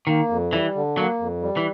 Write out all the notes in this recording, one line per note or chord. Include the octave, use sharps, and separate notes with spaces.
D#3 A#3
F2
E3 G3
D3
F#3 A#3
F2
G3
E3